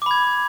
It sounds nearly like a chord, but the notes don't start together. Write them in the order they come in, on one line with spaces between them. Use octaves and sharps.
D6 B5 G#6